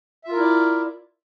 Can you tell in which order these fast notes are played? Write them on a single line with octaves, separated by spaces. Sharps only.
E5 F4 A#4 E4 D5